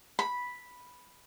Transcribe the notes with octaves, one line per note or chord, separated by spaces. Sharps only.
B5